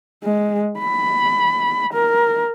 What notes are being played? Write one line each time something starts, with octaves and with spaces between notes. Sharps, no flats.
G#3
B5
A#4